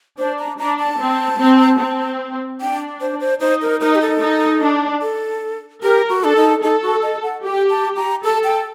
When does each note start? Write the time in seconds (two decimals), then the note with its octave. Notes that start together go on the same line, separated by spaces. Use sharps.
0.18 D4 C5
0.39 A#5
0.59 D4 A#5
0.79 A5
1.00 C4
1.40 C4
1.80 C4
2.60 D4 G5
3.01 C5
3.20 C5
3.41 D#4 C5
3.62 A#4
3.81 D#4 A#4
3.95 G4
4.01 A4
4.21 D#4
4.62 D4
5.02 A4
5.82 G4 A#4
6.09 F#4
6.23 D4 A4
6.36 D#4
6.63 D#4 A4
6.82 F#4
7.03 D#5
7.23 F#5
7.44 G4 G5
7.70 A5
7.97 A#5
8.24 A4 A5
8.44 G5